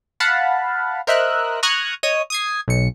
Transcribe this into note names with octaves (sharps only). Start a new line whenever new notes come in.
F5 F#5 A5 B5
A#4 C5 D#5 E5 E6 F#6
A#5 C#6 D#6 F6 F#6 G#6
C#5 D#5 D#6
D#6 G#6 C7
B1 C#7